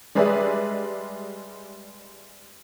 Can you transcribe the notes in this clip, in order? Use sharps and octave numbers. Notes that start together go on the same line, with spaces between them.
G3 G#3 G#4 B4 D5 E5